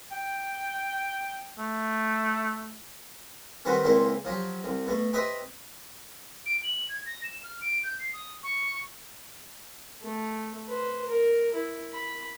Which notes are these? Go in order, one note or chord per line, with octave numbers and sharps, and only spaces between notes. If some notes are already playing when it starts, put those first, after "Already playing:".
G5
A3
D#3 G3 C4 F#4 B4
C#2 A#2 C4 E4 A4
F3 F#3 G4
C2
B2 A3
G4 B4 C5 D#5 E5 G5
D7
F#7
G#6
A#6
E7
F6
D7
G6
C7
D#6
C#6
A3
B4 C5
A#4
E4
B5